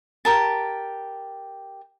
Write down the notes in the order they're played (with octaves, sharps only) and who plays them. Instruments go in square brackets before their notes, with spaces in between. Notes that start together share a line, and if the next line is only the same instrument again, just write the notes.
[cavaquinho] G4 A#4 A5